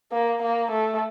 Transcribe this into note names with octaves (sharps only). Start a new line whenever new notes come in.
A#3
A#3
A3